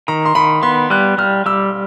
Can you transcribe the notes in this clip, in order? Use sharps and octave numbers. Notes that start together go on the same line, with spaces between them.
D#3 A#5
C6
D#3 B5
B3 C6
G3 F#6
G3 F6
G3 E6